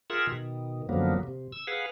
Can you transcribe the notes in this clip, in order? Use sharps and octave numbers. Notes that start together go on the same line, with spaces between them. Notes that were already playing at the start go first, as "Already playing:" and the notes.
F4 G#4 A#4 E5 F#5
B2 D#3
F#2 D3 F3 F#3 A#3 B3
C3
E6
G#4 B4 F5 F#5